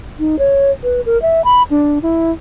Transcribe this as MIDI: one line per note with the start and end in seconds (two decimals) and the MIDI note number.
0.19 0.39 63
0.39 0.71 73
0.83 1.01 71
1.06 1.20 70
1.22 1.44 76
1.44 1.63 83
1.71 1.99 62
2.03 2.32 64